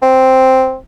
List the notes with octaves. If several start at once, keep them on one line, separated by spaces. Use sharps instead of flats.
C4